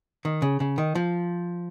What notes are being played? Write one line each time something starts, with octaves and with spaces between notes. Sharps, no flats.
D#3
C#3
C#3
D#3
F3